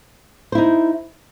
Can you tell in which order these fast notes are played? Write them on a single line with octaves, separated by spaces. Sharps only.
C5 E4 D#4